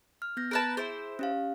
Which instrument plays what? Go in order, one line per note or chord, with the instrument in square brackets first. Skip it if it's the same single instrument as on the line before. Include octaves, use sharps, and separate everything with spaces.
[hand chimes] F6
B3 G6 A#6
[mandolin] A#4 B4 A5
[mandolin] E4 C5 [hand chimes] G#4
[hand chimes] C#4 G4 F5